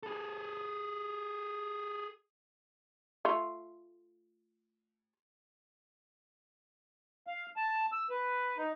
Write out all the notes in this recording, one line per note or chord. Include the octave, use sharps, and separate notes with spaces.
G#4 A4
A3 F4
F5
A5
E6
B4
D#4